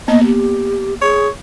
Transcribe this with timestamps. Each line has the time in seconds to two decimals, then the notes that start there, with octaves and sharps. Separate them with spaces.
0.08 A#3 B3 D#5
0.24 G4
1.01 G#4 C#5